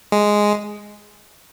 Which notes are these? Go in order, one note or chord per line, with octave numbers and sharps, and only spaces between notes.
G#3